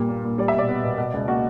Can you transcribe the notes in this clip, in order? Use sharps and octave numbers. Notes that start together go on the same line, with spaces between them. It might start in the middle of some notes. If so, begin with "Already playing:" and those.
Already playing: G2 A#2 G3
A#3
A#2
G3 D5
E5
B2 D5
B3
B2
B2
C#2
A#3 F#4